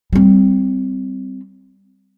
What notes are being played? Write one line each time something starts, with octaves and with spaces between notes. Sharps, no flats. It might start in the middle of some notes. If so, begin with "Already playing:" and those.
G3 C4